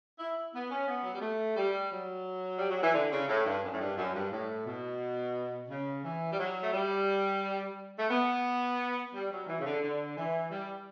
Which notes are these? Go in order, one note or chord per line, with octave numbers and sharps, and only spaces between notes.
E4
B3
C#4
B3
F#3
G3
A3
G3
F#3
G3
F#3
E3
D3
C#3
A2
G2
F#2
A2
G2
F#2
G2
A2
B2
C#3
E3
G3
F#3
A3
G3
A3
B3
G3
F#3
E3
C#3
D3
D3
E3
G3